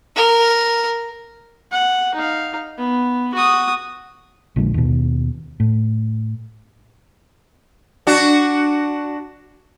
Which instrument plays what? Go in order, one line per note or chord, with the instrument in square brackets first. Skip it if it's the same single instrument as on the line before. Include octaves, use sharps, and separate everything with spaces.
[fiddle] A#4
[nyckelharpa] F#5
D#4 F5
B3
F#4 D#6
[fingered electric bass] A#1 D3 F3 G#3
D#2 B2
A2
[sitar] D4 F#4